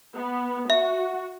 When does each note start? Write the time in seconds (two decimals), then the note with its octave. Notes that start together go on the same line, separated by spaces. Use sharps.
0.17 B3
0.70 F#4 E5